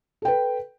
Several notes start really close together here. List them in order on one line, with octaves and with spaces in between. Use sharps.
A4 G5 B4